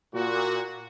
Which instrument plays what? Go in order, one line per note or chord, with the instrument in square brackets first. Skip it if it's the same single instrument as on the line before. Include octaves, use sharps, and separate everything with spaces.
[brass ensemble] A#2 F#4